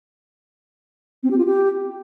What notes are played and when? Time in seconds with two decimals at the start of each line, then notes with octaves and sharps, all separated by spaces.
1.23 C4
1.31 G4
1.38 F4
1.46 G4